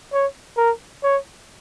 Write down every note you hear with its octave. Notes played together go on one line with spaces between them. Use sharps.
C#5
A#4
C#5